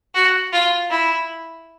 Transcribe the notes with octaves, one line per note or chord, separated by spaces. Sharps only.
F#4
F4
E4